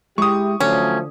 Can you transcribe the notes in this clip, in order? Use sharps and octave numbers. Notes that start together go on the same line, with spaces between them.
G#3 E4 G4 C#6 D#6
D3 F3 F#3 A3 C#4